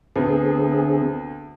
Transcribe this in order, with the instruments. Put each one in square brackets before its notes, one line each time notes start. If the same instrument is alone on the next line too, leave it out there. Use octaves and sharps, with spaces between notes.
[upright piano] D2 B3 [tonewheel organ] D3 C4 G#4